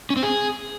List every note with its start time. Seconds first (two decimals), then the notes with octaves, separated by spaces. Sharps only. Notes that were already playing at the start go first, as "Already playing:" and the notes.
0.10 C#4
0.17 C4
0.23 G#4